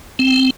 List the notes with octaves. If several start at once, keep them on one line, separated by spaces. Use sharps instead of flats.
C4